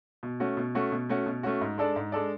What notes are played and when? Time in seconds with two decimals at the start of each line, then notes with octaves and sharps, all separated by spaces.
0.23 B2
0.40 A3 C#4 F#4
0.57 B2
0.75 A3 C#4 F#4
0.92 B2
1.09 A3 C#4 F#4
1.26 B2
1.43 A3 C#4 F#4
1.61 G#2
1.78 G#3 D4 A4 D5
1.96 G#2
2.12 G#3 D4 A4 D5